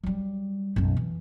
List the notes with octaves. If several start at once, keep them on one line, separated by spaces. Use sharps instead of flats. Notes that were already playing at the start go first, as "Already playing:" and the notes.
F#3 G3
B1 F#2
E3